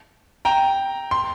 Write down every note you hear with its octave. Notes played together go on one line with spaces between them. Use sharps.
G5 A#5
C6